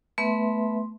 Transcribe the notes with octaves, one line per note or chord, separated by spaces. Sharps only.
A3 B3 B4 E5 C6